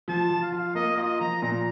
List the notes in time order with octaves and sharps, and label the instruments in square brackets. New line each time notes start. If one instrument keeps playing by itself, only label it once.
[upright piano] F3 [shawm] A5
[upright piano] F3
[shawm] F5
[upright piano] F4
[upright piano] A#3 [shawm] D#5
[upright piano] F4 [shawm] D#5
[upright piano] F3 [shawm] A#5
[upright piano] A#2 [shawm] A#5